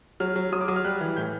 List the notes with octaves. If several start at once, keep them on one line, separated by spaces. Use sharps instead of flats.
F#3 F6
F#3
F#3 D#6
D6
F#3 D#6
F6
G3 F#6
E3
A2 G6